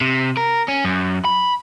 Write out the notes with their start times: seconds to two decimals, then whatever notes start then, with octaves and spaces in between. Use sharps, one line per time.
0.01 C3
0.37 A#4
0.68 C#4
0.85 F#2
1.25 B5